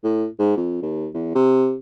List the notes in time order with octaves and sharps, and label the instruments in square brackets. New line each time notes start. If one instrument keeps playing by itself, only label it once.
[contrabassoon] A2
G#2
F2
D#2
E2
C3